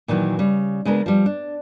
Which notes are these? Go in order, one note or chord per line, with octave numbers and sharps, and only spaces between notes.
A#2 D#3 E3 F#3
C#3 G3
C#3 G#3 B3 D4 A#4
F3 G3
D4